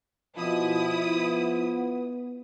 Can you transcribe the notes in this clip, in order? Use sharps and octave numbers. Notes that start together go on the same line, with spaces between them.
B2 F3 E4 D#6
B3